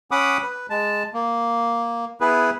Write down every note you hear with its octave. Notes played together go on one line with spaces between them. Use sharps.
C#4 F#5 B5 D6 D#6
B4
G#3 A5
A#3
B3 E4 G#4 B4